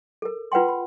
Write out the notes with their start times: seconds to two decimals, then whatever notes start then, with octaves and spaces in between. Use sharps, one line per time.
0.22 A4 A#4
0.52 F4 B4 F#5 G5 C6
0.68 B5